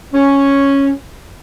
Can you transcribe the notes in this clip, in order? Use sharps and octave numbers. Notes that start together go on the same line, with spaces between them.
C#4